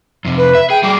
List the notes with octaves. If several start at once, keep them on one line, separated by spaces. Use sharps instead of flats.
F2 C3
B4
E5
G#4 G5
G3 F#4 G#4 D6